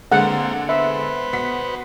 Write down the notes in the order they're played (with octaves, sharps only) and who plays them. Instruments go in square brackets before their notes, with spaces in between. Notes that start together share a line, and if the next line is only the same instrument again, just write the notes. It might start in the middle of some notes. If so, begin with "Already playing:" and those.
[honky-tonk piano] D3 G#3 A4 [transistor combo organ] A#3 C4 [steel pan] F#5
[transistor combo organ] B3 B4 C5 [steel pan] E5
[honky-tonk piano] B2 F#5 B6